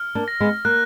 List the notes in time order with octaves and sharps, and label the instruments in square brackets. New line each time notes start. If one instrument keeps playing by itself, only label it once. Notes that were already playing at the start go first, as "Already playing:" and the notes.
Already playing: [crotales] F6
[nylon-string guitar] A#3 D4
[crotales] A#6
[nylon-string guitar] G#3 B3
[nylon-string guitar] A#3 [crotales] F#6